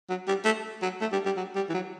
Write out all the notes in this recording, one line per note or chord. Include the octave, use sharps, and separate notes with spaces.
F#3
G3
A3
F#3
A3
G3
G3
F#3
G3
E3
F#3